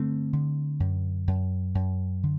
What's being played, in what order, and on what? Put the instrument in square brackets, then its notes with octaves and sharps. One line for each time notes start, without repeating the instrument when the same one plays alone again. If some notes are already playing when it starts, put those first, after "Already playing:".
Already playing: [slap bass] G2 D3 A3 C4
D3
F#2
F#2
F#2
D3